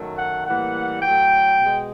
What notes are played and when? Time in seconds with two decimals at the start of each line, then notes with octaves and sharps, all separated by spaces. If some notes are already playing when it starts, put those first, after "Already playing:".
Already playing: F#2 D#3 F#3 A3
0.17 F#5
0.46 A2 E3 G3 A#3 F#5
1.01 A2 F#3 A3 G5
1.58 B2 G#3